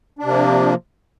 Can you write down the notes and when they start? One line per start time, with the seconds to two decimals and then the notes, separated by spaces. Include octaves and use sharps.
0.19 D4
0.23 C3
0.28 A#3
0.32 F3